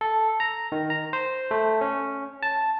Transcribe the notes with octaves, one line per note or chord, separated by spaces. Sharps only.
A4
A#5
D#3
A#5
C5
A3
C#4
A5